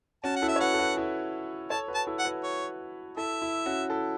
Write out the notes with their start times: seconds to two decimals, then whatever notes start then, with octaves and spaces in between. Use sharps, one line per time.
0.24 C#4 F#4 A5
0.36 F#5
0.42 E4 A4
0.48 E5
0.56 C#5
0.60 F#4 B4 F#5
0.74 A4
0.79 F#4 B4
0.97 E4 A4
1.70 A4 C#5 A5
1.88 F#4 B4
1.95 A5
2.07 E4 A4
2.19 F#5
2.25 F#4 B4
2.43 C#5
3.17 E4 A4 E5
3.42 E4
3.66 C#4 F#4
3.90 E4 A4